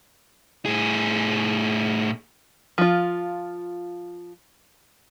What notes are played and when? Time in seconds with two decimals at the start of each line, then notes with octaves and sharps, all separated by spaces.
0.66 A2 G#4
2.78 F3 F4